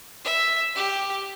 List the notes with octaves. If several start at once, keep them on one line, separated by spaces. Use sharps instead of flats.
E5
G4